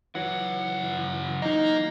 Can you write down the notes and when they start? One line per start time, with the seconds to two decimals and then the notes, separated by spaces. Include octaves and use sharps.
0.15 C#3 E3 F#3 F#5
1.42 A#3 D#4 D#5